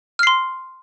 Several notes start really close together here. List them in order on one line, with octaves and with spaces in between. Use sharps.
F6 C7 C6